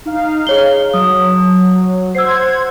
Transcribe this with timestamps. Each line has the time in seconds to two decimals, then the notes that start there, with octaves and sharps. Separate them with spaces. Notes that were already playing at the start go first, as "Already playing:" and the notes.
0.06 D#4 F5
0.47 G#4 C#5 G7
0.94 F#3 D#6
2.15 C5 F#5 E6 G#6 C7